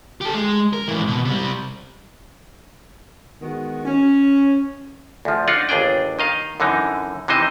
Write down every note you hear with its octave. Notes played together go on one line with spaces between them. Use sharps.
G4 A4
G#3
A#4
G#2 E3
B2
C3 G3
D#3 G#3 B3 F#4
C#4
D2 F3
D4 D#4 F4 F#5
G1 D#2 D4 G#4 G5
D#3 D#5 F5
F#2 D3 E3 D#4
C3 E3 D#4 C5 D#5